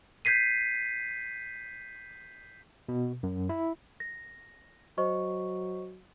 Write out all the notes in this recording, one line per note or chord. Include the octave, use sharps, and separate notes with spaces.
G6 G#6 B6 C7 D#7
B2
F#2
E4
A#6
F#3 C5 D#5 C#6